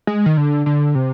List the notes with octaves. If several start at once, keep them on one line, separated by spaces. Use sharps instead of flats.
G#3
D#3
D3
D3
C3